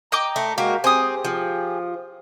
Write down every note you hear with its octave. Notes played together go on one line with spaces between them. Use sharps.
D#5 G5 A#5 D6
A3
G#3 A#3 F#4 G4 A#4
C4 G4 G#4 G#5 D#6
F3